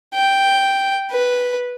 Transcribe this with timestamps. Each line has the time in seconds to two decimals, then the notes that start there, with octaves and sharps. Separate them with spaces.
0.15 G5
1.11 B4